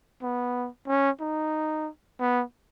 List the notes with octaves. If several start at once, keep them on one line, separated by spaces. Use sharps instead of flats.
B3
C#4
D#4
B3